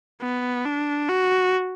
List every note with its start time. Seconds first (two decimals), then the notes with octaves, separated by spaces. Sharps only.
0.22 B3
0.65 D4
1.09 F#4